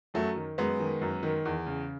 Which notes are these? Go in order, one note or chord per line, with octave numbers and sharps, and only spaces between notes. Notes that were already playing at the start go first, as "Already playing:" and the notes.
F#2 F#3 A3
D#3
F#2 G#3 B3
D#3
F#2
D#3
E2
C#3